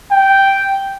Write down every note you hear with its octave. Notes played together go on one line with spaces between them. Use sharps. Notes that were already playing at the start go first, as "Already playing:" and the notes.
G5